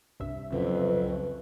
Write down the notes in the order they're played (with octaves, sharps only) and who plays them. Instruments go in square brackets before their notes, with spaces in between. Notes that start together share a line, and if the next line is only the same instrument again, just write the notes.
[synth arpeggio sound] C2 G2 E5
[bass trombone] F2 [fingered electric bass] C#3 F#3 [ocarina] B4